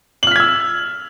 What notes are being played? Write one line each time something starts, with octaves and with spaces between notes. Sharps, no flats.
E6 F6 G#6 B6 F#7